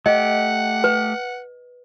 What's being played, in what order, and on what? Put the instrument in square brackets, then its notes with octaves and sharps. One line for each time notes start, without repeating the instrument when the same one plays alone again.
[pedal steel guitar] A3 G4 [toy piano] D#5 [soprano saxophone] F#5
[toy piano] B4